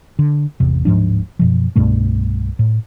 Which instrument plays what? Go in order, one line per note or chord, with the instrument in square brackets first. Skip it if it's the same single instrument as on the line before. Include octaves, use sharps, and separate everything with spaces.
[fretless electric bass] D3
G#1 E2 C3
D1 G#2 F3 D4
F#2 B2 F3
C2 G2 B2 A3
A2